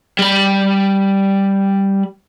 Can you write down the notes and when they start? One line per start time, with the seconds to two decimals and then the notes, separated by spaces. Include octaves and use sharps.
0.19 G3 B5